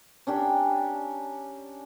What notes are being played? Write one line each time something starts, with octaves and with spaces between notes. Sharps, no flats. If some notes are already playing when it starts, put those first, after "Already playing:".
C#4 D4 G4 A#4